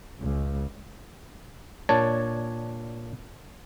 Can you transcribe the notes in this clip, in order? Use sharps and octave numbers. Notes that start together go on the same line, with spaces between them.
C#2
A#2 D4 C#5 A5